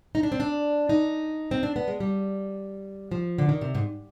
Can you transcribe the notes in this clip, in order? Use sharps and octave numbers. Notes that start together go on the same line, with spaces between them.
D#4
D4
C4
D4
D#4
C4
D4
B3
G#3
G3
F3
D3
D#3
C3
G#2